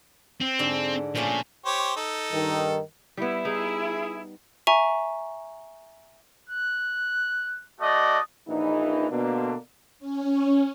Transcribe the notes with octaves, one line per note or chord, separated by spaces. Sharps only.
C4
G#2 D3
A#2 F3 A3 C#4
G4 C5 C#5
D#4 A4
G2 D#3
G3 B3 E4
D#4 G#4
E5 G#5 A#5 C#6
F#6
A3 F#4 D5 D#5
A#1 E3 D#4
B2 D3 A#3 D4
C#4